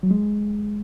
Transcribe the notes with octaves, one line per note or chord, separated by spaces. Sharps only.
F#3
G#3